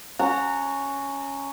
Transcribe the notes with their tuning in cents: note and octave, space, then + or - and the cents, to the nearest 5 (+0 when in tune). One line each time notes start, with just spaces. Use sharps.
C#4 +0 F#5 +0 A#5 -30